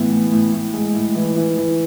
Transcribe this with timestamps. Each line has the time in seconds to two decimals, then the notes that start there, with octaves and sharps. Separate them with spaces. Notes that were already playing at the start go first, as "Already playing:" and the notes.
Already playing: A2 E3 B3
0.11 A2
0.32 A2
0.53 A2
0.74 G#3
0.94 A2
1.15 E3
1.36 E3
1.57 E3